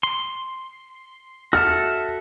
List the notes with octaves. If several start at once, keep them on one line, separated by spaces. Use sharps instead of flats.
C6
F#4 A4 E5 F6